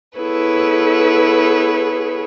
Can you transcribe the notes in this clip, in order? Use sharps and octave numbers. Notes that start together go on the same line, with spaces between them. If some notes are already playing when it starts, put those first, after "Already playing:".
B3 E4 G#4 A4 B4 C#5